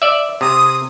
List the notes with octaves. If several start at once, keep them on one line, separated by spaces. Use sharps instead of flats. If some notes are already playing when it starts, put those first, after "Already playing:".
D5 E5
C3 D#6